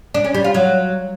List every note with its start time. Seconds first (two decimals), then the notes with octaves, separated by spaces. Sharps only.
0.14 D4
0.24 C#4
0.34 G3
0.44 F4
0.54 F#3